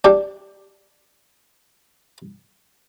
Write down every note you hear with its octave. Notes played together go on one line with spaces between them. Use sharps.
D4 G4